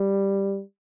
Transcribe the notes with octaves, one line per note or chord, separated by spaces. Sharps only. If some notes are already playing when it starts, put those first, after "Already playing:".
Already playing: G3